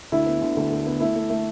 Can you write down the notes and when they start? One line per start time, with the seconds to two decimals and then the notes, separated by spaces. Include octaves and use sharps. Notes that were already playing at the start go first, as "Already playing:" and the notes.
0.12 D2 E4
0.26 B3
0.41 D3
0.57 D2
0.72 D2
0.86 B3
1.00 A3 E4
1.16 A3
1.30 A3